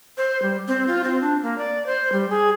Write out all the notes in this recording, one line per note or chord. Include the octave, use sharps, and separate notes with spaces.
C5
G3
C4
F4
C4
D4
A#3
D5
C5
G3
G#4